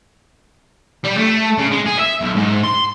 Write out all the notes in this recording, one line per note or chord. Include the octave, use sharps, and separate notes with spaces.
G3
A3
C#3
G#3
G#4
E5
B1
G#2
C6